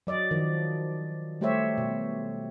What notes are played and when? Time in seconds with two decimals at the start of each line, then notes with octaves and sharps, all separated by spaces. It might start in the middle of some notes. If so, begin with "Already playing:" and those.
0.07 F#3 D5 D#5
0.31 D#3 F3
1.41 G3 A3 G4 C5 C#5 E5
1.78 B2